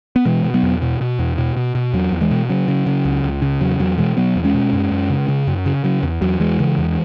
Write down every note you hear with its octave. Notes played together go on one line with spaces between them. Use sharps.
B3
B2 E3 G#3
B2
F#3 B3
E2
B2
B2
E2
B2
B2
B2
E2 F#3
E2
E3 G#3
B2
C#3 F#3
C#3
C#3
C#2
C#2
C#3
E2 F#3
E2 F#3
B2 E3 G#3
B2 F#3 B3
E2
G#3 C#4
B2
F#2
F#2
C#3
C#3
F#2
C#3
C#3 F#3
E2
E2 F#3
E2 E3 G#3
C#3
E2